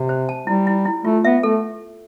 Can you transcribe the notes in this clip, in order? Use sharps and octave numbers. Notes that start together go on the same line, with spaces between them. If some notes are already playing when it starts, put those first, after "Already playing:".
Already playing: C3
C5
A5
G3 E4
E4
E4
A3 F4
B3 E5
A3 A4